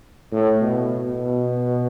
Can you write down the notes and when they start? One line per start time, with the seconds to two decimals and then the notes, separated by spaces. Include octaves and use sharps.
0.32 A2
0.61 B2
0.91 B2